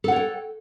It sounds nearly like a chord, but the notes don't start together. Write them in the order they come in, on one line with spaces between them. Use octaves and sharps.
A4 F#5 C#5 G5